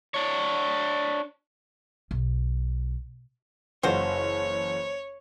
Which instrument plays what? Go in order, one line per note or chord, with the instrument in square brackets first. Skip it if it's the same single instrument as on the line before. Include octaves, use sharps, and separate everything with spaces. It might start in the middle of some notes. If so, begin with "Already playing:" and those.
[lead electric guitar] D4 C#5
[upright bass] B1
[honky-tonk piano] F#1 E3 [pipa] F4 F#4 C5 [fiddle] C#5